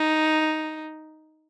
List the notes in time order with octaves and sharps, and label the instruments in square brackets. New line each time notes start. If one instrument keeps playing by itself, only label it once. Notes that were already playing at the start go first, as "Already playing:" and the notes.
Already playing: [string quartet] D#4